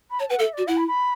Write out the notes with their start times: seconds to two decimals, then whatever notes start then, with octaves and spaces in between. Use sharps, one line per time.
0.10 B5
0.20 C#5 A5
0.30 B4 F#5
0.39 A4 E5
0.53 F#4 D5
0.67 E4 F#5
0.77 B5
0.87 B5